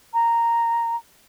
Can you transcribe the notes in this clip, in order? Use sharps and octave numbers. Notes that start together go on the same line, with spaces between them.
A#5